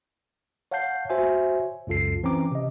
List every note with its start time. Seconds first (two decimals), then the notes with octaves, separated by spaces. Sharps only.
0.71 C#5 F5 F#5 A5 G6 C7
1.09 F#4 C5 C#5 E5 G#5
1.87 C#2 F#2 F4 A4 C7
2.23 E3 C4 C#4 A#5 D6
2.51 C3 D#5